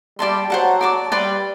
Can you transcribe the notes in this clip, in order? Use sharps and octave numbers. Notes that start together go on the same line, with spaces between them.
G3 G4 D5 A5 C6
F#3 C5 F#5 A5
D5 A5 D6
G3 B4 D5 G5 C6